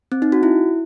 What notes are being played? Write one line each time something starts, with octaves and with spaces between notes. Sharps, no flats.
C4
D#4
F#4
E4